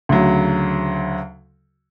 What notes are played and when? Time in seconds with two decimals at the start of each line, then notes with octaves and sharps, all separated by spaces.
0.09 D2 C#3 F#3